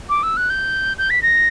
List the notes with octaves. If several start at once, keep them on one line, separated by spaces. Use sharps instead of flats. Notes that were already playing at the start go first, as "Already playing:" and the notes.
D6
E6
F#6
G6
G6
B6
A#6